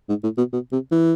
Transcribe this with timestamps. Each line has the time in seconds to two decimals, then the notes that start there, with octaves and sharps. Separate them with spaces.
0.09 G#2
0.23 A2
0.38 B2
0.52 B2
0.72 C3
0.91 E3